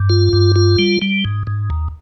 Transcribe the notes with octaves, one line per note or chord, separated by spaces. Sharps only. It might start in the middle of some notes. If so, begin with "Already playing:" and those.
Already playing: G2
F4
G2
F4
G3
G3
G#2
G#2
D#2